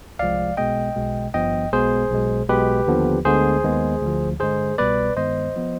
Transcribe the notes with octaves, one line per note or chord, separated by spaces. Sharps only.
C2 C3 F3 G#3 D5 F5
B1 B2 G#3 B3 D#5 G5
B1 B2 G#3
G#1 G2 F3 B3 D#5 G5
B1 B2 G#3 B3 G#4 C5
B1 B2 G#3
B1 B2 G#3 G4 B4
D#2 D3 F3 B3
D2 D3 G#3 B3 G#4 C5
D#2 D#3 G#3 B3
D2 D3 F3
G2 D3 G#3 G#4 C5
C2 B2 G3 B3 B4 D5
G2 D#3 G#3 B3 C5 D#5
F3 B3